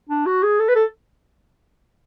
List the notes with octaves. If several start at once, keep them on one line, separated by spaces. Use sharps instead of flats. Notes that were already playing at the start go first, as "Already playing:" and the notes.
D4
F#4
G#4
A4
B4
A4